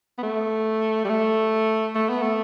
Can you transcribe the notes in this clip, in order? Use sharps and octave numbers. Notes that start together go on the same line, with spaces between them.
B3
A3
G3
A3
A3
B3
A3